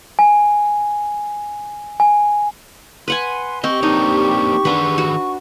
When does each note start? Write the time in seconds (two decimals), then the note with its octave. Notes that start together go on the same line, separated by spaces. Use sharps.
0.19 G#5
2.00 G#5
3.08 B4 F#5 G#5 C6
3.64 C4 G4 D#5 C#6
3.83 A#3 C4 D4 D#4
4.65 D#3 D4 G#4 B4 F#5
4.98 F#4